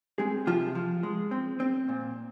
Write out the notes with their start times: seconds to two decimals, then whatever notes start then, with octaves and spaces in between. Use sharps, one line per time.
0.18 G#3 C4 G#4
0.47 C3 F3 F4
0.75 F3
1.03 G#3
1.31 C4
1.60 C4
1.89 A#2